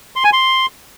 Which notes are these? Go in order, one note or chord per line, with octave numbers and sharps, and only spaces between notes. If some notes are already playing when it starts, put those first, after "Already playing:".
C6
G#5
C6